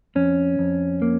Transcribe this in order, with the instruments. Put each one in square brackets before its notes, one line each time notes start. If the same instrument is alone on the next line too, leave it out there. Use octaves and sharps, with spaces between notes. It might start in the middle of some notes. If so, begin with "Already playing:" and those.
[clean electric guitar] F2 C#4
F2
A#3